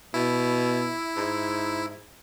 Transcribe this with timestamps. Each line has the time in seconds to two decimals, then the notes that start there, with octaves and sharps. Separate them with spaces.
0.14 B2 E4
1.16 G#2